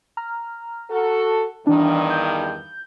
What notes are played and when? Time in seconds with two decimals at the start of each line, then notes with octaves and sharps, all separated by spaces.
0.17 A#5 F6
0.90 F#4 A4
1.67 E2 G2 D#3 E3 D4
2.10 G6